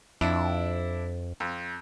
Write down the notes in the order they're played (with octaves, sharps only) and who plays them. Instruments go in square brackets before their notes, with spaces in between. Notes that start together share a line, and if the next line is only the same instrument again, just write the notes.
[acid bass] F2 [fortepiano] D4 E4
[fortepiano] F2